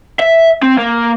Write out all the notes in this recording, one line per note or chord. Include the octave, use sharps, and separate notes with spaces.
E5
C4
A#3